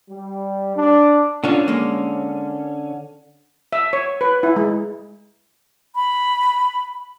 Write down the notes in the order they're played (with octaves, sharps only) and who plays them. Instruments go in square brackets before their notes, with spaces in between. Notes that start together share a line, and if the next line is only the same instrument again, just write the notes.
[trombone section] G3
D4
[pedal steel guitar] D3 C#4 [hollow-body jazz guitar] D4 F4
[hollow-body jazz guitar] G#3 A#3
[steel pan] E5
C#5
B4
E4
G#3
[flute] B5